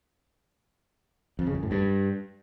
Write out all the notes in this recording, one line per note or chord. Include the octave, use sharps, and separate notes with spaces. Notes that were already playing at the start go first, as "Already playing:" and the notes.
F2
C#3
F#2
A2
G2